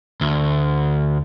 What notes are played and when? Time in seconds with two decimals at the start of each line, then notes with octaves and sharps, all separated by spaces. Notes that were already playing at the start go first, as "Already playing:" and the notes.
0.21 D2